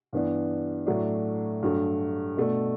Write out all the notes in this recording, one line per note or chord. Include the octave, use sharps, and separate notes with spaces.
G2 E3 B3 D4
A2 F#3 A3 D4
G2 F#3 A3
B2 A3 D4